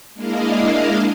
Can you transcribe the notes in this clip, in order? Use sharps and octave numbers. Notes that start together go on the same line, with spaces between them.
G#3 A#3 D4 E4 D#5 F5